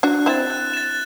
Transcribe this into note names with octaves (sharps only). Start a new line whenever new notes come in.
D4 F#4 F#6
C4 E4 A6 E7
F#6
A6 E7